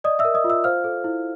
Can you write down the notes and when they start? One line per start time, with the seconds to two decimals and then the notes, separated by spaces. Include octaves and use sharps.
0.04 D5 D#5 D#6
0.19 E5 E6
0.25 A#4
0.34 D#5 D#6
0.44 F4
0.50 E5 E6
0.64 C5 F5 F6
0.84 A4
1.04 E4